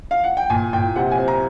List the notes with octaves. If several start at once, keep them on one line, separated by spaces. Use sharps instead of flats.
F5
F#5
G5
A#2 G#5
A#2 G5
C3 F#5
G#5
C4
A#5